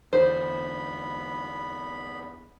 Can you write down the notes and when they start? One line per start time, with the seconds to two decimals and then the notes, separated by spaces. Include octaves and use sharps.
0.13 E2 D3 B3 C5 B5